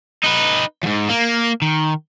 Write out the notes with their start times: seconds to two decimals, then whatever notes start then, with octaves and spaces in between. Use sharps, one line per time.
0.24 D#4 B4
0.83 E2 G#2
1.09 A#3
1.62 D#3